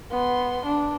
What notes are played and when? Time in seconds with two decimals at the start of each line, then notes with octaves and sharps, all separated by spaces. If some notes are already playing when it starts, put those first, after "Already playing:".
0.12 B3 C6
0.66 D4